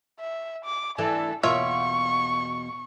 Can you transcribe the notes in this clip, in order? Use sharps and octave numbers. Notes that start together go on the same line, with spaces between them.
E5
D6
E3 A3 D4 A4
E2 B2 A#3 F4 C#5 E5 C#6